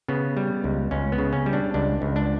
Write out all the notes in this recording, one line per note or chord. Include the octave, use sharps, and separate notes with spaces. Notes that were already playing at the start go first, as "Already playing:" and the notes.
C#3 B3
G3
C#2
C#2 C#4
B3
C#3
C#4
G3
D4
C#2 D4
C#2
D4